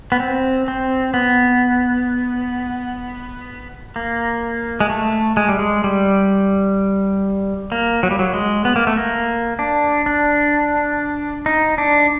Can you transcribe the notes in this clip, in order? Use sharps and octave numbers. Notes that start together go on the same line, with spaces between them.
B3
C4
C4
B3
A#3
G#3
A3
G#3
G3
G#3
G3
A#3
F#3
G3
F#3
G#3
B3
A#3
A3
A#3
D4
D4
D#4
D4